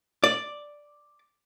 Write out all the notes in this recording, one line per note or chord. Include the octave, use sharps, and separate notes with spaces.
D5